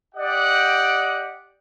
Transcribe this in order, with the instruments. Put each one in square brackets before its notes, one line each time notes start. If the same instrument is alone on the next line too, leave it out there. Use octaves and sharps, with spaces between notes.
[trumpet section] G4 D5 D#5 F#5 G5